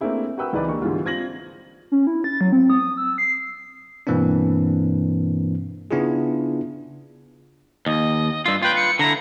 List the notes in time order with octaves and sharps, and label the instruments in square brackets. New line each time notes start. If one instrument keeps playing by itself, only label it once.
[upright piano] A3 A#3 C4 D4 E4 G#4
F#4 A#4 B4 G5 E6
C#2 E3 D#4 B4 D5
D3 A#3 G4 C#6
G#2 D3 E3 G3 F4 F#4
C4 F4 G#6 A#6 F#7
[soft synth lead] C#4
E4
A6
F#3
C4
D#6
E6
C7
[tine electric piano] G2 B2 E3 A#3 C4 D4
C#3 B3 D4 E4 F4 G#4
[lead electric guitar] D#2 [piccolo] D#5
[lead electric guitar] G2 F4 [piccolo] E6
[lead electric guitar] F4 B4 [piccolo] G5
[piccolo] C#7
[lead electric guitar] D3 E4 [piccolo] A#5